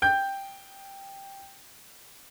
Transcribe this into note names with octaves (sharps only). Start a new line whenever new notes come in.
G5 G6